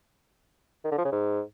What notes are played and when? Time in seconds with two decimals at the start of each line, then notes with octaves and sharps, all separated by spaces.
0.84 D#3
0.91 D3
0.98 F3
1.05 C#3
1.12 G#2